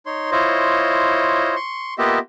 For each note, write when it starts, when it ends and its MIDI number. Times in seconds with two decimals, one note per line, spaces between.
0.06 0.30 63
0.06 0.30 73
0.06 0.30 84
0.31 1.55 64
0.31 1.55 65
0.31 1.55 72
0.31 1.55 73
0.31 1.55 75
1.56 1.94 84
1.56 1.94 85
1.98 2.19 58
1.98 2.19 59
1.98 2.19 65
1.98 2.19 67
1.98 2.19 75
1.98 2.19 76